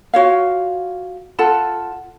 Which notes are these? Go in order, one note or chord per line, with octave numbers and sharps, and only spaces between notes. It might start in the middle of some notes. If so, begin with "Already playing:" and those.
F4 F#4 C#5 F5
F4 A4 F#5 A5